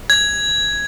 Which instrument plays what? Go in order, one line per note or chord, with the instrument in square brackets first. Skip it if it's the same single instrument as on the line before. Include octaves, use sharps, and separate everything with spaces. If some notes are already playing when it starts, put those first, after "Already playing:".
[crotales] G#6